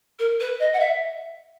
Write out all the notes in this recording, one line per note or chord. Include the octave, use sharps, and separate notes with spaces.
A#4
B4
D#5
F#5
E5